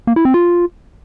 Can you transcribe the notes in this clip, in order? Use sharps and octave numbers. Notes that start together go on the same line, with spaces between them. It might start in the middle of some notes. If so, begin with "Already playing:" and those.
A#3
E4
C4
F4